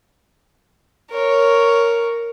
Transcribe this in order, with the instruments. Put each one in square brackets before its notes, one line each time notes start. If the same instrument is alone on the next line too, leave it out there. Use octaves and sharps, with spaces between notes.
[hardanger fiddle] A#4 C#5